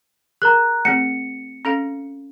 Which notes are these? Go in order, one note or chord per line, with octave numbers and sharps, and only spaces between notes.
G#4 A#4 A#5 F#6
A3 C4 G#4 C#7
C#4 A4 F5